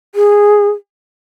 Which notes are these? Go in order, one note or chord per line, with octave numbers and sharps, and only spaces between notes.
G#4